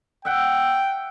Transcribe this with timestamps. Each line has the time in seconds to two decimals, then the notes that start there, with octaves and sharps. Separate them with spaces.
0.25 E5 F#5 G5